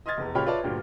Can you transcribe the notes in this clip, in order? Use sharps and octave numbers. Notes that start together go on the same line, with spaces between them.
D#5 C6 D#6 F6 G#6 A6
F1 E2
C#2 A#2 G4 C#5 B5 F6
F4 B4 C#5 D5 E5 A5
D2 G2 A#2 G3